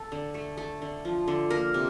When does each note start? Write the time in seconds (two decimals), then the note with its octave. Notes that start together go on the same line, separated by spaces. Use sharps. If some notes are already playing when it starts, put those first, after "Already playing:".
Already playing: A4
0.12 D3
0.34 A3
0.57 A3
0.82 D3
1.05 F3
1.28 D3
1.50 A#3 A#4
1.74 C3